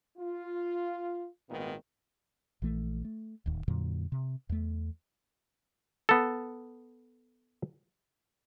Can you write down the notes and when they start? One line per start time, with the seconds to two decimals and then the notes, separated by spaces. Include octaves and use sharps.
0.18 F4
1.49 G#1 A#2 D#3 B3
2.62 A#1 E3 A3
3.05 A3
3.46 D1 D#2
3.68 F2 A#2 D3 F#3
4.12 C3
4.49 E2 A3
6.09 B3 A4